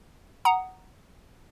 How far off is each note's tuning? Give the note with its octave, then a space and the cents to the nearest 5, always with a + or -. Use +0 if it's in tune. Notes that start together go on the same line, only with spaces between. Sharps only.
F#5 +10 A#5 +0 D#6 +0